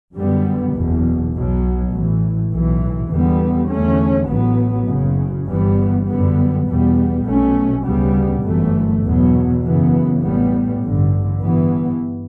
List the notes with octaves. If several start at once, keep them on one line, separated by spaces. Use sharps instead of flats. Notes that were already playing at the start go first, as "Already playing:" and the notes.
F#2 D3 G3 B3
F#1 E2 B2
B1 B2 F#3
A1 A2 E3
B1 A2 E3
E2 D3 G3 B3
E2 D3 A3 C#4
A1 A2 F#3 B3
F#1 F#2 C#3
G1 G2 E3 G3 B3
F#2 D3 G3 B3
E2 B2 G3 B3
B1 B2 A3 C#4
D2 C#3 G3 B3
G1 F#2 E3 A3
E2 B2 F#3 B3
F#2 C#3 E3 B3
A1 A2 G3 B3
A1 G2 D3
G2 E3 B3